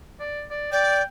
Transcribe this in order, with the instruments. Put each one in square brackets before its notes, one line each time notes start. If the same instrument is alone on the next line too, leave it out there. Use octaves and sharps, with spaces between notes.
[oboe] D5
D5
[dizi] D5 [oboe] G5